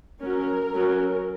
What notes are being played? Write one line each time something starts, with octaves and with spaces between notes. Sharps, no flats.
F#3 C#4 A#4
F#3 C#4